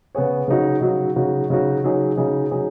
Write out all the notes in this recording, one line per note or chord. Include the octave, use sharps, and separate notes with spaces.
C#3 B3 G#4 C#5
C#3 F#3 D#4 F#4
C#3 F#3 D#4 F#4
C#3 F#3 D#4 F#4
C#3 F#3 D#4 F#4
C#3 F#3 D#4 G#4
C#3 F#3 D#4 G#4
C#3 F#3 D#4 G#4